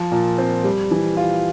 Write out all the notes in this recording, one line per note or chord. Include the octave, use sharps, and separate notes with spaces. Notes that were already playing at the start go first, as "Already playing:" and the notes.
Already playing: F3
A#2
C4
G3
E3
F4